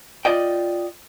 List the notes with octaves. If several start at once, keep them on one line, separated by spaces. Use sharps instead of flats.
F4 D5 D#5 G5